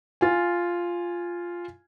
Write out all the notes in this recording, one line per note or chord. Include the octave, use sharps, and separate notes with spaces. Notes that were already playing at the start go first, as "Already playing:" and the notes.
F4 G#5